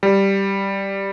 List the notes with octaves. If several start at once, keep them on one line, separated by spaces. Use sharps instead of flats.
G3